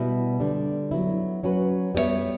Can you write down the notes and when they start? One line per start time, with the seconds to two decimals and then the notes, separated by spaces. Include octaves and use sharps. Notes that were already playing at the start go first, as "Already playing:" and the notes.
Already playing: B2 G3 B3 E4
0.40 D3 G3 D4
0.91 F#3 B3 E4
1.43 F#3 C#4 F#4 B4
1.95 G3 B3 F#4 C#5 E5